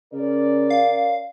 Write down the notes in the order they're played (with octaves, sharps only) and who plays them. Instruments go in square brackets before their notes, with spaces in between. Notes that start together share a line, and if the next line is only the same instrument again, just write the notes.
[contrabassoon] C#3 [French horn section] C#4 A#4 D5
[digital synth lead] F5